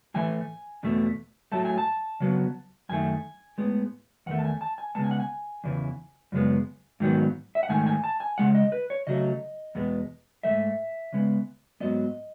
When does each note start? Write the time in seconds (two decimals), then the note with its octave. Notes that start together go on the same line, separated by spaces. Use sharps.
0.14 A2 E3 A3 G#5
0.83 E2 B2 A3
1.52 A2 F#3 A3 A5
1.65 G#5
1.78 A5
2.20 C#3 F#3 B3
2.89 F#2 D#3 A3 G#5
3.58 A2 G#3 B3
4.26 E2 D#3 A3 F#5
4.39 A5
4.44 G#5
4.61 A5
4.78 G#5
4.95 C#3 G#3 B3 A5
5.04 G#5
5.11 F#5
5.20 G#5
5.64 E2 C#3 E3
6.32 F#2 C#3 G#3 B3
7.00 G#2 D#3 F#3 B3
7.55 E5
7.63 F#5
7.69 G#2 D#3 A3 G#5
7.86 G#5
8.04 A5
8.20 G#5
8.38 C#3 G#3 F#5
8.55 D#5
8.72 B4
8.90 C#5
9.07 C#3 F#3 A3 D#5
9.75 E2 B2 G#3 B3
10.43 E3 A3 E5
10.48 G#2
11.12 C#3 G#3 B3
11.80 G#2 F#3 B3 D#5